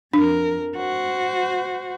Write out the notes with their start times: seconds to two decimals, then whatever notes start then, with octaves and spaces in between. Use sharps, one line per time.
0.14 F2 D4 A#4
0.77 F#4 C5